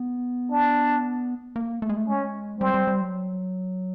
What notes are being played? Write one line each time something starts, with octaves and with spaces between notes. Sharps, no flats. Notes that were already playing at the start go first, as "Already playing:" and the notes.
Already playing: B3
D4
A#3
A3
G#3
A3
G#3 C#4
G3 C4
G3
G3
F#3